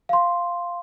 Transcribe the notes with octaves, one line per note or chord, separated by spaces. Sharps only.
F5 C6